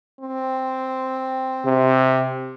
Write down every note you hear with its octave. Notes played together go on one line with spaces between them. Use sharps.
C4
C3